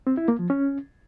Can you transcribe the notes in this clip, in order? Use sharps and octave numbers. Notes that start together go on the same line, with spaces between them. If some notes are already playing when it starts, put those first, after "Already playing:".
C4
E4
A#3
F3
C#4